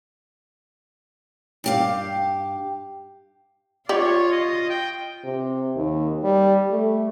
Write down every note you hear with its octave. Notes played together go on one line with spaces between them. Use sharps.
G2 G4 F5
F4 G4 C#5 D5
D#5
G5
C3
D#2
G3
A3